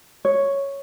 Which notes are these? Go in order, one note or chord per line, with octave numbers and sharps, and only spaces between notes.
C#5